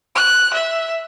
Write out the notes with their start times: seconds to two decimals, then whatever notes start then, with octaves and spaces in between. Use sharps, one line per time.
0.15 F#6
0.54 E5